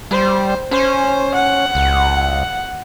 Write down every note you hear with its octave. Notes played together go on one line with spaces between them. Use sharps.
G3 C5
C#4 C5
F#5
C#2